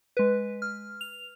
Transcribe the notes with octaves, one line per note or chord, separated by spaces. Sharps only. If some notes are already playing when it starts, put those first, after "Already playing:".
G#3 B4
F6
F7